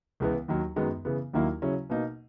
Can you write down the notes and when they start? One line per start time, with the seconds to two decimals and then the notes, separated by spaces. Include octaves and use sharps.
0.20 C#2 C#3 E3 B3
0.48 D#2 D#3 F#3
0.76 F#2 D#3 G#3 B3
1.05 C#3 E3 B3
1.33 D#2 D#3 F#3 A#3 E4
1.62 C#3 F#3 C#4 E4
1.90 B2 A#3 D#4